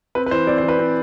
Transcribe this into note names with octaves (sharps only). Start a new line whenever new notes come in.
C4 B4
B4
E3 C5
C4 D5
C5
E3
B4
C4